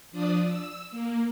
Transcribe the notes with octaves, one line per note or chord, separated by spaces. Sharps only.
F3 D4 D5 D#6
E6
A#3